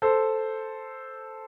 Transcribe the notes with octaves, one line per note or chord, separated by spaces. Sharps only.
A4 C5